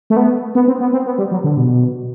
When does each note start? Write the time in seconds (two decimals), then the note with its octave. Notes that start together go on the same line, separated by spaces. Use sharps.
0.10 A3
0.17 B3
0.55 B3
0.68 C4
0.80 B3
0.93 C4
1.06 B3
1.18 G3
1.31 F#3
1.44 D3
1.57 B2